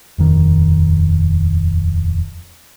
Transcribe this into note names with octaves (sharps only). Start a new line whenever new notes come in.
D#1 F2 D#3